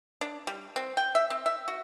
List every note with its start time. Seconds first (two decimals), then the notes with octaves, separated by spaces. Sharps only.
0.21 D4
0.47 G3
0.76 C4
0.97 G5
1.15 E5
1.30 C4
1.46 E5
1.68 F#4